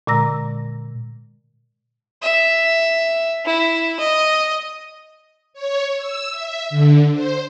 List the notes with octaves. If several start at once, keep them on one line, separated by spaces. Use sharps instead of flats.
A#2 D3 G#3 A#5 E6 A#6
E5
E4
D#5
C#5
E6
E5
D3
C5